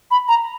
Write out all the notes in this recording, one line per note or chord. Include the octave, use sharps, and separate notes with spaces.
B5
A#5